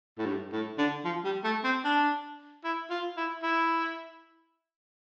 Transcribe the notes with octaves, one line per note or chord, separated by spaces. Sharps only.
A2
G2
A2
D3
F3
G3
A3
C4
D4
E4
F4
E4
E4